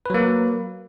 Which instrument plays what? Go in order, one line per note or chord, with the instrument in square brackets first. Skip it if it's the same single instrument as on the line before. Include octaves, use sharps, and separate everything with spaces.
[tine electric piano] B4
F#3
A#3